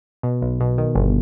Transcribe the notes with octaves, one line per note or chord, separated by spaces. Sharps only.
B2
B1
B2
D#3
G1